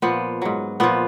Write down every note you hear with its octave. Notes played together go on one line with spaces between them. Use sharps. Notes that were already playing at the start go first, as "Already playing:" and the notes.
A#2 F3 B3
G#2 F#3
A#2 F3 B3